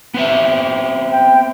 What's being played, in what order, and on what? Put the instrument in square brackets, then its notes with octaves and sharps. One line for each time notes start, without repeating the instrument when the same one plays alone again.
[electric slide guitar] B3 C4 E5
[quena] G5